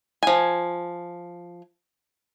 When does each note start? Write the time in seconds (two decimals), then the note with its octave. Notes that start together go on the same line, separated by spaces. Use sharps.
0.23 F3 G#5